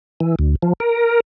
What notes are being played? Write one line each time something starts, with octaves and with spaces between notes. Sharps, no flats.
E3
D2
F3
A#4